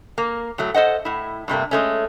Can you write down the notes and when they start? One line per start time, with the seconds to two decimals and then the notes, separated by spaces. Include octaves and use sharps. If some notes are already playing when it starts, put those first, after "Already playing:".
0.18 A#3
0.58 A2 F#3 A3
0.74 A4 C5 D#5 F#5
1.05 A2 E4
1.48 G2 C3 A3 A#3
1.71 G#3 A3 C#4